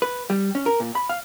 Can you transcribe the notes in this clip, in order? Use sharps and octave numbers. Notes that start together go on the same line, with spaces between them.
B4
G3
C#4
A#4
A#2
B5
F5